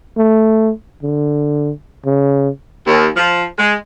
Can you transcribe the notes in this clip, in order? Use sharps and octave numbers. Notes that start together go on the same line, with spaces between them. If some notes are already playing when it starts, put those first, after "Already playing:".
A3
D3
C#3
D#2
F3
G#3